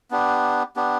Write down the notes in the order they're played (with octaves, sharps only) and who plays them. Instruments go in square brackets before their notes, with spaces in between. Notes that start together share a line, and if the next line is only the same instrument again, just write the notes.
[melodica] B3 D4 G4
B3 D4 G4